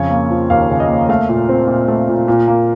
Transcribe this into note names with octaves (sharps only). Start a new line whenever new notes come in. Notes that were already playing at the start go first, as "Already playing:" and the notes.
Already playing: F2 C#3 C#5
A#3
F3
D#2 F5
C#3
D#5
A#3
A3 F5
A#2
C4
A#2
A3
A#2
A#2
A#3